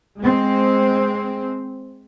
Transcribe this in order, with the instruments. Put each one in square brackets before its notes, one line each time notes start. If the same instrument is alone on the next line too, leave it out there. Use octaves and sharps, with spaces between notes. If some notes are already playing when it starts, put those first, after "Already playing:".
[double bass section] G#3 C4